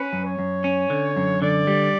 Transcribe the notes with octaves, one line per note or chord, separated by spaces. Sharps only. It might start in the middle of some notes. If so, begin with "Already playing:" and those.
Already playing: C#4 B4
F#2
C#5
F#2
C#4
D3
F#2
D3 D5
G3